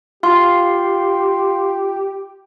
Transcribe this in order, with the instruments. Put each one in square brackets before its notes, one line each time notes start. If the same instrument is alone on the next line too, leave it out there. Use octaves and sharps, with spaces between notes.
[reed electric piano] F4 [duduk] G4 [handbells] F5 C6